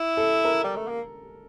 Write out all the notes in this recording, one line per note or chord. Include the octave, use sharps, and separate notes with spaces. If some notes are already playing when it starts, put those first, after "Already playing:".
Already playing: E4
A4
A#4
G3
A3
A#3